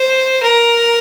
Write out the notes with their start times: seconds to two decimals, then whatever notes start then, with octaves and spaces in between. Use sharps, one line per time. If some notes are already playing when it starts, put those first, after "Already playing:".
Already playing: C5
0.43 A#4